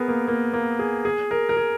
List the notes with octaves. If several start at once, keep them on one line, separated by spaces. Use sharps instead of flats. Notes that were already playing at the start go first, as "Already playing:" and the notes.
Already playing: B3 G#4 A#4
A#3
A#3
A#3
G#4
G#4
A#4
A#4
G#4